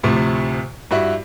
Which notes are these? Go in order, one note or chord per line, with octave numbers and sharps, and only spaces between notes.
D2 A2 C3 F3
G2 E4 F#4